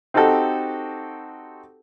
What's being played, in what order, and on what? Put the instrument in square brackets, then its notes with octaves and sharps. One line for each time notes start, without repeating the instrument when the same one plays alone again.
[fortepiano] C4 D#4 F#4 G4 A4